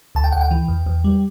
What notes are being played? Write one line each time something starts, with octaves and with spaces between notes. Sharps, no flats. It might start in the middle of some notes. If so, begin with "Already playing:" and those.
D2 A5
G5
D2 F#5
G5
E3
E2
E2
G3